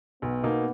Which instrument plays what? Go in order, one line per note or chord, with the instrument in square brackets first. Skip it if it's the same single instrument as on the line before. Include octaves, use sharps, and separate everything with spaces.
[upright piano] B1 [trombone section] B3
[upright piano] B2 A#3 D#4